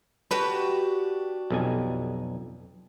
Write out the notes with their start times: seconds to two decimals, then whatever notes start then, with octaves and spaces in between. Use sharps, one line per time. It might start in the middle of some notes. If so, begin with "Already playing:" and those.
0.31 D4 F#4 G4 B4
1.50 B1 F2 G#5